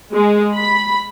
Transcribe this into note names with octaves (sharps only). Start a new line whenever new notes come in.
G#3
B5